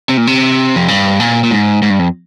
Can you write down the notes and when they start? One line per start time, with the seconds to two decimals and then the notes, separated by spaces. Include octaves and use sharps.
0.09 C3
0.17 A#2
0.27 C3
0.76 F2
0.88 G2
1.20 A#2
1.43 A#2
1.51 G#2
1.82 G#2
1.90 G2
1.99 F2